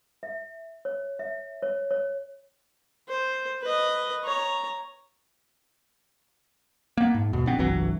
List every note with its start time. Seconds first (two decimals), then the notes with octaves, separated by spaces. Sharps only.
0.23 E5
0.85 C#5
1.19 E5
1.62 C#5
1.91 C#5
3.08 C5
3.62 B4 D#5
4.24 C#5 A#5
6.97 A#3 B3
7.14 G#2
7.33 D#2 B2
7.46 D1 A#1 B3 C4
7.59 G1 C2 E3 F#3